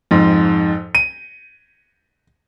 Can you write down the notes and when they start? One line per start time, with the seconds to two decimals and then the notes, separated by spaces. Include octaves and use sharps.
0.11 F2 G#2
0.95 D#7